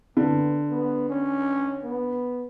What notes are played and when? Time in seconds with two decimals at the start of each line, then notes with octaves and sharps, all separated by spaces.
0.17 D3 B3
0.71 B3
1.09 C#4
1.83 B3